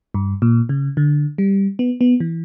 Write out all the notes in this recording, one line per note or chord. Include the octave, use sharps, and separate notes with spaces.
G2
A#2
C#3
D3
G3
B3
B3
E3